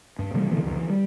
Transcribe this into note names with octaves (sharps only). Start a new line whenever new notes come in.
G2
C3 E3 G3 A3
B2 D3 E3 B3
C#2 F#2
E3
G3